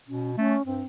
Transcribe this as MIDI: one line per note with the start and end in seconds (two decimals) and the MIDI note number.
0.08 0.36 47
0.08 0.31 61
0.38 0.56 57
0.38 0.65 61
0.66 0.82 43
0.66 0.86 60